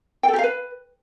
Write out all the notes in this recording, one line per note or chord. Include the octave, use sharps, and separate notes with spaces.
G5
A4
G4
F5
B4